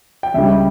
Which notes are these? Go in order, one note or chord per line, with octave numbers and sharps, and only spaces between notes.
G5
C#2 C#3 G3 E5
G5